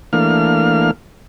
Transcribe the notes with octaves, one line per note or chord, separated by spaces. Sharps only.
E3 A3 A#3 D4 F5 F6